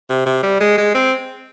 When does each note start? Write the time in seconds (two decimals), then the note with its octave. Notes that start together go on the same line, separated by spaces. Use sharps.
0.10 C3
0.26 C3
0.43 G3
0.60 G#3
0.78 G#3
0.95 C4